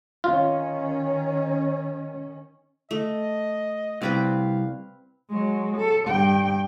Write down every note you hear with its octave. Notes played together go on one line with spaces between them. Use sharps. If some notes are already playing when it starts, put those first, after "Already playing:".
D#3 C#4 F4
A3 D#5
C2 C4 B4 F5 G5
F#3 G#3
A4
G2 G5